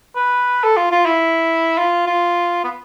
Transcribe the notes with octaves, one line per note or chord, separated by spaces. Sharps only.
B4
A4
F4
F4
E4
F4
F4
B3